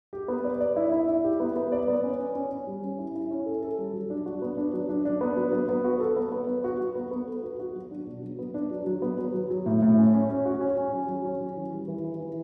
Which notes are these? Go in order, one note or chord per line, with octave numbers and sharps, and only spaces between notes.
G4
B3
D5
D5
E4
E4
E4
G4
B3
B3
D5
B3
C#4
C#4
C#4
C#4
G3
C#4
E4
E4
C#4
A4
A4
G3
F#3
D4
F#4
B3
D4
F#3
D4
D4
B3
F#3
B3
B3
F#4
A4
B3
B3
B3
F#4
F#4
B3
B3
A4
F#4
F#4
F#3
D4
B2
F#3
B3
D4
F#3
F#3
B3
F#3
F#3
F#3
A2
A2
C#4
C#4
C#4
F#4
C#4
C#4
F#3
F#3
C#4
F#3
E3
G3
E3
E4
E3